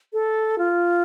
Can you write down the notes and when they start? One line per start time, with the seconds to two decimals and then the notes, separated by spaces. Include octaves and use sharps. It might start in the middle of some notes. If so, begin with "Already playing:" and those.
0.13 A4
0.58 F4